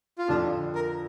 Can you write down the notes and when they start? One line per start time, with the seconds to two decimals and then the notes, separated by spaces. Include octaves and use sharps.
0.18 F4
0.29 F2 D3 F3 D4
0.75 A#4